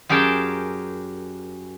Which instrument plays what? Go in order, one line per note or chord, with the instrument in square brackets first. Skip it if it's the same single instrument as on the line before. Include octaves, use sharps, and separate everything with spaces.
[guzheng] F#2 G4 G#4 A#4 G5 A5